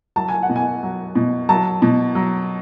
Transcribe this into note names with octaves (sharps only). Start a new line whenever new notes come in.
F#3 A5
G#5
F#5
B2
G#5
F#3
B2
F#3 A5
B2
F#3